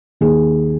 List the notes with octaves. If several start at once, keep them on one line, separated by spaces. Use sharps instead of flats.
D#2 D#3 G#4